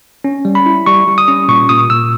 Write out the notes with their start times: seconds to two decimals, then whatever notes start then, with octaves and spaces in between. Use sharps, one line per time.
0.24 C#4
0.45 G3
0.55 B5
0.66 E4
0.86 G3 C#6
1.07 G3
1.18 D#6
1.28 C#4
1.48 A#2 C#6
1.69 A#2 D#6
1.90 A#2 E6